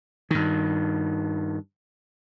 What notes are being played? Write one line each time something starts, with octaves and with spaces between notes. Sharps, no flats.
G2 D#3